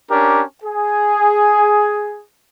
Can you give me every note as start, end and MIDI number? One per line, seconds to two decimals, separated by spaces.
0.10 0.42 61
0.10 0.42 62
0.10 0.42 67
0.10 0.42 70
0.62 2.24 68